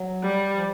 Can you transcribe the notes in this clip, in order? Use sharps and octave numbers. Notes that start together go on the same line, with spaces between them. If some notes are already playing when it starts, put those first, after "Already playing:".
Already playing: F#3
G3
F3